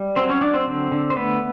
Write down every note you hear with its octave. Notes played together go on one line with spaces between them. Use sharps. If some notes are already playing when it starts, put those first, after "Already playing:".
Already playing: G3
F#3 C4 C5
C#4 C#5
F#3 D4 D5
C4 C5
D3
D3
C5
A3 B3 B4